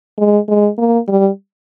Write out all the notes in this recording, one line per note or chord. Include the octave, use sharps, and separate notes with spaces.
G#3
G#3
A#3
G3